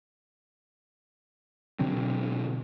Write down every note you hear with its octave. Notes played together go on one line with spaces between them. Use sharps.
B2 D3 F#3 C4